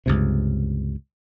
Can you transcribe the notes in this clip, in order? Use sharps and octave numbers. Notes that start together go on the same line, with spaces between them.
C#2 G2 C3